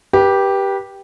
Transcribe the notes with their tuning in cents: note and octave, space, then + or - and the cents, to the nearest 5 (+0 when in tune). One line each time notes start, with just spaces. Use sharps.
G4 +0 B4 -35